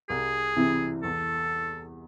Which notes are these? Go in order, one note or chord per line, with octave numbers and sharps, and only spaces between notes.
C2 G#4
C3 E3 C4 E4
E2 A4